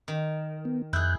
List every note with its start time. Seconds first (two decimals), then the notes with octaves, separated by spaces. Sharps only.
0.08 D#3
0.65 B3
0.93 F2 E4 G#4 F#6 G6